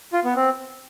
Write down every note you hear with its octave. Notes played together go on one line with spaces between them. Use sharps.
F4
B3
C4